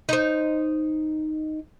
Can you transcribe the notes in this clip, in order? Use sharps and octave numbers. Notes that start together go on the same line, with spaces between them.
D#4 C5